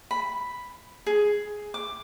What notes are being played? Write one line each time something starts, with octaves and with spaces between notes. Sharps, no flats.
B5
G#4
D6